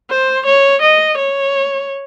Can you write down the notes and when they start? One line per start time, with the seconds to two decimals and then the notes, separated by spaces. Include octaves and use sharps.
0.10 C5
0.46 C#5
0.82 D#5
1.18 C#5